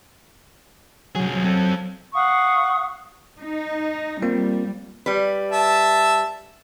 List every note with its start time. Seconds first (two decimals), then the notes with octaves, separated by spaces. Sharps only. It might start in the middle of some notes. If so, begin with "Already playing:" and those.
1.15 C2 F#3 G#4
1.45 C4 A4
2.14 F5 F#5 C#6 D#6
3.39 D#4
4.22 G3 A#3 C4 F4
5.06 G3 B4
5.52 E5 A5